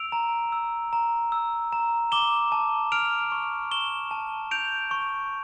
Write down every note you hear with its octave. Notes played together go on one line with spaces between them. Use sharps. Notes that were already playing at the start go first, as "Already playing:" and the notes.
Already playing: E6 D7 F7
A#5
E6
A#5
E6
A#5
D6 E7 G7
A5
F6 D7 F7
C#6
C#6 E7 G7
A5
G6 D7 F7
C#6